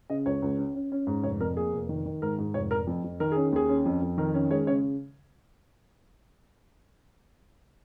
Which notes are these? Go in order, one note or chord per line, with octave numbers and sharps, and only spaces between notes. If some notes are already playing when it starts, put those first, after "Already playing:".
C#3 D#5
C#2 C#5
C#2
C#4
C#4
C#4
G#2
F1 C#5
F2 A#4
A#3 G#4
F1
D#3
D#3
G#2 A#4
G#2
F1 C#5
F1 A#4
F2
F2
D#3 A#4
C#4 G#4
D#2 G#4
C#4
F2
F2
D#3 A#4
C#4
G#3 C#5
C#3 C#5